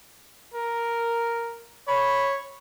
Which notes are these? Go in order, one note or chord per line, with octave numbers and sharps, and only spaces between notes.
A#4
C#5 B5